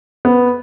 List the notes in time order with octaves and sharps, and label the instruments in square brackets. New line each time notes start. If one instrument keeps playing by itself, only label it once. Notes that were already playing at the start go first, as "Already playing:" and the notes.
[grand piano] B3